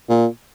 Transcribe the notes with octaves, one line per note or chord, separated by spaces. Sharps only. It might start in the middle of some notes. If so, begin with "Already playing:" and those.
A#2